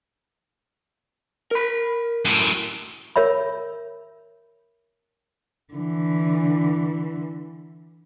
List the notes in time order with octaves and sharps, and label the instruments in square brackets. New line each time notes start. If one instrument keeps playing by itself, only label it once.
[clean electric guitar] A#4 B5
[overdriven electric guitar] F#2 A2
[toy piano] A#4 C#5 E5 B5
[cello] D3 E3